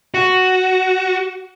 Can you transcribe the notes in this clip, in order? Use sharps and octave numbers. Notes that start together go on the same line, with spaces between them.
F#4